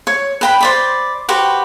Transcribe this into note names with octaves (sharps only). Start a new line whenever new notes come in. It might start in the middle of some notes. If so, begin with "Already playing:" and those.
C#5
B4 G5 B5
C5 D5 B5
F#4 G4 B4 C5